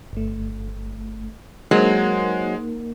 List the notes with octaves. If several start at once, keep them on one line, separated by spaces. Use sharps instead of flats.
G1 A3
F#3 G#3 A#3 D#4 A#4 C5